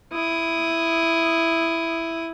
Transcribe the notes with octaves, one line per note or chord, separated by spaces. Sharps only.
E4 D#6